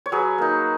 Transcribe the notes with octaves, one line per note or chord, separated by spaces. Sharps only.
C#5
F#3 G#4 B4
A#3 D#4